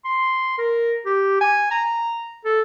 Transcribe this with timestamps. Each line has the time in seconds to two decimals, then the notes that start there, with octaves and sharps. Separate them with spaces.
0.05 C6
0.58 A#4
1.06 G4
1.41 G#5
1.71 A#5
2.45 A4